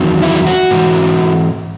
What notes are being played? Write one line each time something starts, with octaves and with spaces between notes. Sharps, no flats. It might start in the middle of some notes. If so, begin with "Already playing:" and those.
Already playing: E2 D#3 F#3
E4
F#4
G#2 E3